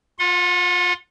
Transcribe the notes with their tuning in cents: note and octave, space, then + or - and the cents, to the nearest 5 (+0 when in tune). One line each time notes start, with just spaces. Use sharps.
F4 +20 F#5 -30 C6 +0